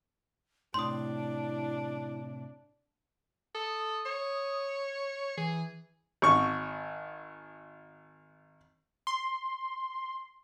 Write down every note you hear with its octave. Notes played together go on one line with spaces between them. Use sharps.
A2 C3 D4 E4 C6 D#6
A4 D#6
C#5
E3 G#4
G#1 C#6
C6